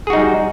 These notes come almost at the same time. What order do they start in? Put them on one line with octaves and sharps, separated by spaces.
G#4 F#4 D#4 G3